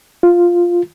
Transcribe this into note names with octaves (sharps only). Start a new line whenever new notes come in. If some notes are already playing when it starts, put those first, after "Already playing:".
F4